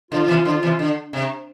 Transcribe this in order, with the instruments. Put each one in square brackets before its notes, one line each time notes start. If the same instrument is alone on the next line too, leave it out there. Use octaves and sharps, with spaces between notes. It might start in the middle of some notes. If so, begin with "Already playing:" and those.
[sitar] D3 F3 [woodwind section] F4
[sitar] F3
C3 E3
[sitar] D3 F3 [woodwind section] F4
[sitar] C3 E3
D3
C3